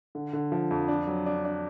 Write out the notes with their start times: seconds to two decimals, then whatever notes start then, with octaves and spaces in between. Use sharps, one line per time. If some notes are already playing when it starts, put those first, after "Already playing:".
0.15 D3
0.33 D3
0.52 F3
0.71 F2
0.88 D4
1.07 F#3
1.26 D4
1.45 D4